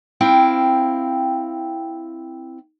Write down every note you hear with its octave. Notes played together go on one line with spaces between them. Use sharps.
C4 E4 F5 G5